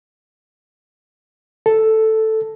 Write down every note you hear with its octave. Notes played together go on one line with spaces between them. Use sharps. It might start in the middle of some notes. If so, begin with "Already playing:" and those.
A4